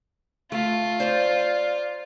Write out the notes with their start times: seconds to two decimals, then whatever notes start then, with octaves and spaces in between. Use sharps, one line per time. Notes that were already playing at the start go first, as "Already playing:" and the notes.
0.52 A3 F4
1.00 C5 D5 A#5